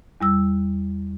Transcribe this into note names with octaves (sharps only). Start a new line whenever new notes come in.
E2 G3 E6